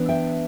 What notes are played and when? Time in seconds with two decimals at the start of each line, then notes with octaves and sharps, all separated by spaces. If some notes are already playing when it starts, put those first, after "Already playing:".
Already playing: E3 B3 D4
0.09 E5 G5